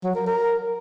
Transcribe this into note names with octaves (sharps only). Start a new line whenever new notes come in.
F#3
A#4
A#4